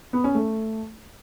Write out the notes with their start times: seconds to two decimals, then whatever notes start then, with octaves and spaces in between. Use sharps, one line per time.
0.13 B3
0.24 C#4
0.35 A3